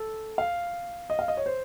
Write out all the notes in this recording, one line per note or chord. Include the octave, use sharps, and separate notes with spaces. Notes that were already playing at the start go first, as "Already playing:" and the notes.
Already playing: A4
F5
D#5
F5
D#5
C#5
C5